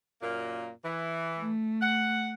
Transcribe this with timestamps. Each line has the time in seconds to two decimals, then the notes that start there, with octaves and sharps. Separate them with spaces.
0.22 F#2 A#2 A#3
0.84 E3
1.38 A3
1.82 F#5